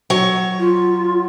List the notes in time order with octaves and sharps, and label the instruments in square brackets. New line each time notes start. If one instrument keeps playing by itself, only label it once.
[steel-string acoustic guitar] F#3 C#5
[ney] F4